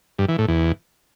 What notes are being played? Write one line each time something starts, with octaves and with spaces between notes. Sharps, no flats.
G2
E3
A2
E2